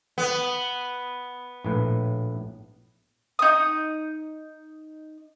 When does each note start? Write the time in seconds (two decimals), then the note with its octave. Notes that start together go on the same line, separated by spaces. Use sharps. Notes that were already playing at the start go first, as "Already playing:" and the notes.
0.18 B3
1.65 A#1 A2 B4
3.39 D#4 D#6